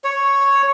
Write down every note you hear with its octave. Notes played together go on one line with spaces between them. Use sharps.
C#5